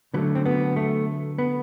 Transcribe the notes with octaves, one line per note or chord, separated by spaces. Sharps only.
D3 F#3 A3 B3
C4
B3
A3
B3